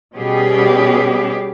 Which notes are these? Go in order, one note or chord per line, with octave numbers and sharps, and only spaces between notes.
B2 G3 B3 C#4 G4 G#4